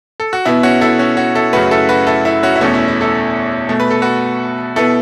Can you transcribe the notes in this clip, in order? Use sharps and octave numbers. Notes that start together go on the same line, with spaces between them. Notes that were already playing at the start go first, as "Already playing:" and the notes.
A4
F#4
B2 B3 E4
C#4 F#4
E4 A4
C#4 F#4
C#4 F#4
E4 A4
F#2 C#3 A3 F#4 B4
E4 A4
F#4 B4
E4 A4
E4 A4
C#4 F#4
E4
E2 B2 A3 C#4
E4
E4
E4 A4
B2 A3
B4
A4
F#4 B4
B2 B3 E4 A4